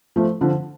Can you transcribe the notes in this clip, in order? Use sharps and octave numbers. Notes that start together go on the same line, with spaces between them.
F3 A3
D3 F3